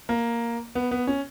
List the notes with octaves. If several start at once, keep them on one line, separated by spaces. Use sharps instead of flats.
A#3
B3
B3
C#4